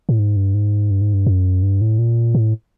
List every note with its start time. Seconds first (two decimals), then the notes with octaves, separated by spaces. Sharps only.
0.09 A2
0.19 G#2
0.36 G2
0.54 G#2
0.91 G2
1.01 G#2
1.14 G2
1.27 F#2
1.62 G2
1.81 A2
1.98 A#2
2.35 A2